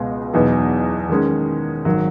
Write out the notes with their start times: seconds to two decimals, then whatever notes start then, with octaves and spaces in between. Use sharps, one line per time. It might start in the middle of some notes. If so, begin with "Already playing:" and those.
Already playing: C#2 B2 G#3 B3
0.33 E2 B2 F#3 B3 D#4
1.09 D#3 G#3 C#4
1.85 G#1 D#3 F#3